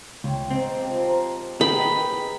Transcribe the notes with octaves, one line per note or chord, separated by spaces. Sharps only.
C#2 C#5 G5 C6
G#2 C4
F3 G4
A#4 C6
D#3 G#4 B4 G5 B5